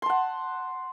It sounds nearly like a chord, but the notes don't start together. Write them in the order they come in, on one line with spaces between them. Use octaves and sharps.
C6 A5 F#5